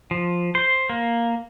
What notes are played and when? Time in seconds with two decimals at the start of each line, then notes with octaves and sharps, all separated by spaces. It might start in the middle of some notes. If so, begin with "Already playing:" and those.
0.11 F3
0.55 C5
0.90 A#3